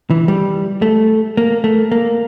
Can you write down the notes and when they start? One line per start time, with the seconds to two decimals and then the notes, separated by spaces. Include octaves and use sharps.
0.10 E3
0.28 G3
0.82 A3
1.37 A#3
1.64 A3
1.92 A#3